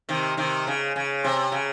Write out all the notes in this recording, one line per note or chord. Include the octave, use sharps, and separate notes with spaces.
C3 D#3
C3 D#3
C#3
C#3
C3
C#3